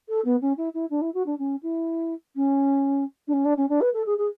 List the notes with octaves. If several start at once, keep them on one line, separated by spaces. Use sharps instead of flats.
A4
B3
C#4
E4
E4
D4
E4
F#4
D4
C#4
E4
C#4
D4
C#4
D4
C#4
D4
B4
A4
G#4
G#4